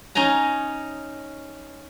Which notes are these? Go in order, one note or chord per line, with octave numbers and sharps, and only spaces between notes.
C#4 D#4 G#5 A#5